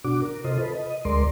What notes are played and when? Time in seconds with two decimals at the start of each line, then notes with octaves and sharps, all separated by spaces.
0.04 B2 D4 F#4 D6
0.22 A#4
0.44 C3 F4 A4 C5 D#5
0.61 A4 B4
0.75 D#5
1.05 D2 G#3 A#4 D5 C6